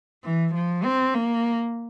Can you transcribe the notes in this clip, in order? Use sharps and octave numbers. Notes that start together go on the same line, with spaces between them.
E3
F3
C4
A#3